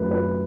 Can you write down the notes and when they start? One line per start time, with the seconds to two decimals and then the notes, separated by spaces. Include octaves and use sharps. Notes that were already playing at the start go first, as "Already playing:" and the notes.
Already playing: F#2 D#3 F#3 A3 B4
0.11 B4